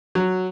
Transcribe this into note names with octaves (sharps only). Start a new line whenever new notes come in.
F#3